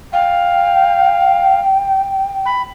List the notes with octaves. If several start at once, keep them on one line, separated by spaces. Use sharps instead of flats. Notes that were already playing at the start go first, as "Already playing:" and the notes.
F5 G5
B5